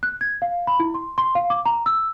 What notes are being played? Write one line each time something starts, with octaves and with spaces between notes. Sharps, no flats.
F#6
G#6
F5
B5
E4
C6
C6
F5
D6
A#5
E6